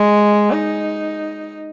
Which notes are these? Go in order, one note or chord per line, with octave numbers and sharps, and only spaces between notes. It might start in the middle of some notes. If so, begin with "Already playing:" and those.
Already playing: G#3
D#4